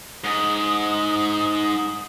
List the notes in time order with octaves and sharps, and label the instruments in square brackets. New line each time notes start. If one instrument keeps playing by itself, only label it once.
[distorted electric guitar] G#2 [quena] D#6